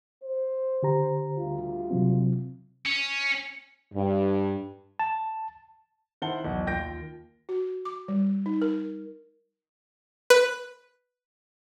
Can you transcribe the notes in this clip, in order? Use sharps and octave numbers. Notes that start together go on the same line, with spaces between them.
C5
D3 G4 A#5
D2 G3 F4
C3 F#3 C4
C#4
G2
A5
D#3 E4 C5 F#5 A5 G7
B1 E2
D#2 F4 G5 G6 A#6 D7
F#4
D6
G3
D#4
A#4
B4